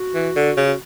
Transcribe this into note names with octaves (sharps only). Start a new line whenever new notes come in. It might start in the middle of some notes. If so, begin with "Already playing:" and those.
Already playing: F#4
E3
D3
C#3
F#4